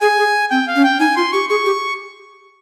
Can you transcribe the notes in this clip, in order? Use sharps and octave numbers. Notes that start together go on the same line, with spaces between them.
G#4 G#5
G#4
C4 G5
F5
C#4
G5
D#4 G#5
F4 C6
G4 C#6
G#4 C#6
G4